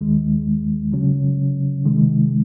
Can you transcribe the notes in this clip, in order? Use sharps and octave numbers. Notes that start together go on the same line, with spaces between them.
D#2 D#3 G#3
C#3 F#3 C#4
C3 D#3 G#3